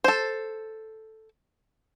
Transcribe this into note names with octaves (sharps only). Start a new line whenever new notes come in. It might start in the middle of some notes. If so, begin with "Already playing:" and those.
A4 C5